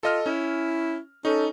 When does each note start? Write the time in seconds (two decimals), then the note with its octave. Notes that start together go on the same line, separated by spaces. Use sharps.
0.03 F4 A4 D#5 F6
0.26 C#4 E4
1.25 C#4 D#4 A4